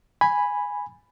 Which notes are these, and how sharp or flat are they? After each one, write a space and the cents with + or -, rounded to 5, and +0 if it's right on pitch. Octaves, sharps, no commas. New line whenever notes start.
G#5 -5 B5 +0